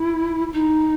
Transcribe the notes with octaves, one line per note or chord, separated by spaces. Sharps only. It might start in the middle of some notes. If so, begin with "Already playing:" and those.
Already playing: E4
D#4